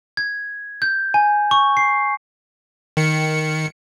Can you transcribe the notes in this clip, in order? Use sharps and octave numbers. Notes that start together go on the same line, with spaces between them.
G#6
G6
G#5
C#6
C7
D#3 C#7